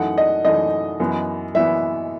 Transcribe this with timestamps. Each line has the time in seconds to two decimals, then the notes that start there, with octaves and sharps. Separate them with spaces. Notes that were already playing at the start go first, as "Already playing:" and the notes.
Already playing: F#2 E3 A3 D#4 F#5
0.18 D#5
0.44 F#2 E3 A3 D#4 D#5
1.00 F#2 E3 B3
1.54 F#2 E3 B3 E5